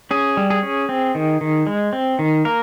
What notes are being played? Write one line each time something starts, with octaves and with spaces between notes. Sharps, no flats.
C#4 G#4
G3
G#4
C#4
C4
D#3
D#3
G#3
C4
D#3
A#3 A#4